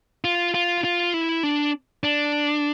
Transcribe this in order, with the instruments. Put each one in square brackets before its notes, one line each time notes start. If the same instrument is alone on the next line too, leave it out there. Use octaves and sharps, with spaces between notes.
[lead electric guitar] F4
F4
F4
E4
D4
D4